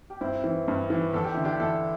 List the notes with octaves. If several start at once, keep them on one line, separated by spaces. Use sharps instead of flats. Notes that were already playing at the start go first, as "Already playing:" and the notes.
G4
G2 C4 E4
E3
G2
E3
E2 A4
G4
D3 E4
D4 G4
E2 E4 A4